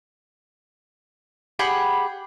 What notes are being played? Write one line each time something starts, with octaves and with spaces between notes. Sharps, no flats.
G4 G#4 F#5 B5